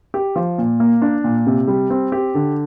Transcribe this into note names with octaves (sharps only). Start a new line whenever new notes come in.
G4
F3
A#2
A#3
D4
A#2
C3
G3
C4
G4
D3